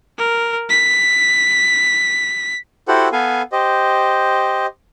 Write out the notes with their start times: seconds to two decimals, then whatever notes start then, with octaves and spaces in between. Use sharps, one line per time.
0.18 A#4
0.70 B6
2.88 E4 F#4 G4 A4 C5 F#5
3.12 B3 A4 B4 F5 G#5
3.52 G4 C5 D#5